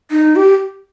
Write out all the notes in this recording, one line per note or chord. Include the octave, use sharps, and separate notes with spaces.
D#4
G4